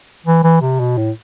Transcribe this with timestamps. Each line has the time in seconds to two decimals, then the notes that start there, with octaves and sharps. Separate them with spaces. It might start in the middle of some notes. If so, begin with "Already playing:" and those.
0.26 E3
0.44 E3
0.61 C3
0.80 B2
0.97 A2